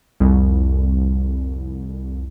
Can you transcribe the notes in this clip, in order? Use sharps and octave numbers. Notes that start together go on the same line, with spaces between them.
C2 F2